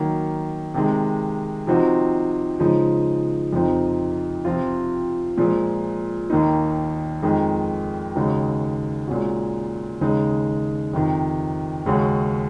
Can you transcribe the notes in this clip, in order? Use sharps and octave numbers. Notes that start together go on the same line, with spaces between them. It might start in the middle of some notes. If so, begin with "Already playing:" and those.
Already playing: D#3 F#3 A#3
C3 D#3 G#3
C3 F3 C4 D#4 F#4
C#3 F3 G#3 D#4
F2 C3 F3 C4 D#4
C3 F3 C4 F4
A#2 F3 G#3
D#2 D#3 A#3 D#4
F2 D#3 G#3 D#4
D#2 C#3 G#3 D#4 F#4
A#2 G#3 C#4 F#4
D#2 C#3 G#3 D#4
F2 C3 D#3
D#2 C#3 G#3 C#4 F#4